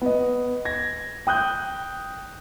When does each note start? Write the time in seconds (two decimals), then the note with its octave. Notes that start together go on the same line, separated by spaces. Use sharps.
0.02 B3 D#5
0.65 G#6 A#6
1.27 G5 D#6 F#6 G6